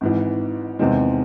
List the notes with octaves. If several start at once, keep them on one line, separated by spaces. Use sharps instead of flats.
G#1 G#2 E3
E2 C3 D#3 G#3 C4